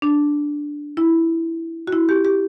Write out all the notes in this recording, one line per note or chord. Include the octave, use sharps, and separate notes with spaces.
D4
E4
F#4
E4
G4
G4